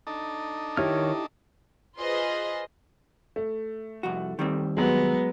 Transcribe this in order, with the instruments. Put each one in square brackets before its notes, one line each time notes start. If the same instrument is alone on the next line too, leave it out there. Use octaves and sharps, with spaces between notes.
[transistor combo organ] D4 D#4 A4
[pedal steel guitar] D#3 C#5 F6 [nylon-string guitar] E4 G4
[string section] F4 G#4 B4 C5 D#5 C6
[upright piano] A3
[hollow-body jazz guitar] C2 F2 F#4
D#3 G3 C4
[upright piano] F#3 G#3 [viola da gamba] B3